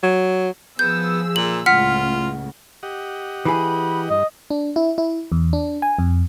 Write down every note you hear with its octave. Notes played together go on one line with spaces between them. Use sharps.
F#3
F3 B3 G#4 E6 G6
A#2 F#7
C#2 A2 F4 F#5 F6 B6
G4 D#5 F#5
E3 G#4 B5
G2 D#5
D4
E4
E4
E2
D4
G#5
F2